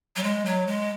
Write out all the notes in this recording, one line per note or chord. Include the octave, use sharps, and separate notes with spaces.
F#3
G#3
F#3
G#3